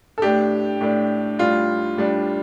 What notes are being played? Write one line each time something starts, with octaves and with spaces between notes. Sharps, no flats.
A4
A2 A3 D4 G4
A2 A3 D4
A2 G3 D4 F4
A2 G3 D4